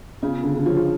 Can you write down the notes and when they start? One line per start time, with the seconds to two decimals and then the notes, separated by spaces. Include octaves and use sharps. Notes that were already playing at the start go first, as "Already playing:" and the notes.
0.22 C#3 B3 F4 G#4
0.43 D3
0.57 D3
0.66 F3 F4 G#4 C#5
0.77 F3